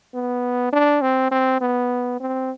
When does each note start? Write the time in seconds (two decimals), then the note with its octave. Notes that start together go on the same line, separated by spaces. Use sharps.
0.14 B3
0.72 D4
1.02 C4
1.31 C4
1.61 B3
2.20 C4